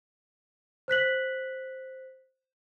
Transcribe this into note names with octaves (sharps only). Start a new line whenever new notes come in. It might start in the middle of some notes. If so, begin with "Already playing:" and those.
C5 F#6 B6 F#7